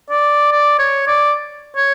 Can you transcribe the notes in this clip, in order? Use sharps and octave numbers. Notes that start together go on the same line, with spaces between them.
D5
D5
C#5
D5
C#5